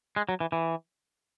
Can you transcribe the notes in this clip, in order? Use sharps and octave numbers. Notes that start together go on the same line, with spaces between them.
G#3
F#3
E3
E3